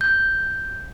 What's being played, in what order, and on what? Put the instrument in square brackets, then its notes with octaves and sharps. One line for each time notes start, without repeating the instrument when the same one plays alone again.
[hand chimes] G6